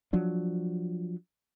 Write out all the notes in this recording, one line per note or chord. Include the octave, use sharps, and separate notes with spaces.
F3 F#3 D4